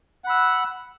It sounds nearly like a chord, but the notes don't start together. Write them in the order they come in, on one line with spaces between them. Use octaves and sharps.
F#5 B5 E6